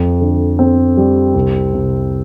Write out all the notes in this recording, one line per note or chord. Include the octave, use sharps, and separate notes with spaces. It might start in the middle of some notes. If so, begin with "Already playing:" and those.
Already playing: F2
D3
C4
G3
C2
C3